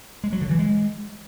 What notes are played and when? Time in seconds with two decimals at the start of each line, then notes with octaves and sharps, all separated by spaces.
0.24 G#3
0.32 F#3
0.41 D3
0.50 E3
0.59 G#3